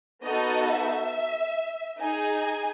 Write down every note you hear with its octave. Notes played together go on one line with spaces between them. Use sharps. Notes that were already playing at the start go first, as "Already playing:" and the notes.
B3 D#4 F#4 A4 D#5
E5
D#4 G#4 G#5